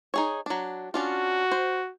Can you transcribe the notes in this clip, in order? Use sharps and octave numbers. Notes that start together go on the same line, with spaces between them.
D#4 G#4 C#5
F#3 D4
C#4 D4 F4 F#4
C5